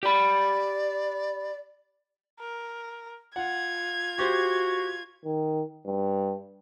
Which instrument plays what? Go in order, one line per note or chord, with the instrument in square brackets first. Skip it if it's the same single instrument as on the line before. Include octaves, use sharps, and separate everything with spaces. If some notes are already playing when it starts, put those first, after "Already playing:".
[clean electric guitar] G4 B5 [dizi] D5
[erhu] A#4
[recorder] F4 [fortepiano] F#5 [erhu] G#6
[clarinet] F#4 [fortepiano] G4 C5
[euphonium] D#3
G2